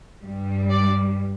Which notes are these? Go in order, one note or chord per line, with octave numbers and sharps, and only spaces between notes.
G2 G3
D5